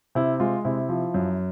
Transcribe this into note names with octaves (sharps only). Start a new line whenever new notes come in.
C3 E4
G#3 F4
C3 E4
F3
F#2